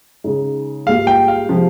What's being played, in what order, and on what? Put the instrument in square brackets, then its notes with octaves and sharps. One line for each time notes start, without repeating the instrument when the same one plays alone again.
[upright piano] C#3 G#3 D#4
[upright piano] G#2 G3 A#3 F4 [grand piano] F5
[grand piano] G5
F5
[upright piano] C3 F3 G#3 C4